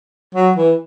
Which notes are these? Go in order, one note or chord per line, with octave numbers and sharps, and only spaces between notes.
F#3
E3